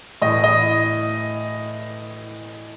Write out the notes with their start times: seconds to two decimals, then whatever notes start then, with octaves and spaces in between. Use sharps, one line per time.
0.22 A2 E3 D#5
0.44 D#5